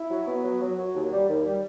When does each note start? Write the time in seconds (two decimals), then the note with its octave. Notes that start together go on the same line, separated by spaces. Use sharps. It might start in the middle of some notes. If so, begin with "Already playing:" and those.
Already playing: E4
0.10 F#3
0.27 B3
0.44 F#3
0.62 F#3
0.78 F#3
0.95 D#2
1.12 G3
1.29 D#2
1.46 G3